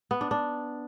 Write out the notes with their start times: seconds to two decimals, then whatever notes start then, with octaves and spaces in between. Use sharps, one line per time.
0.11 B3
0.21 D4
0.31 D4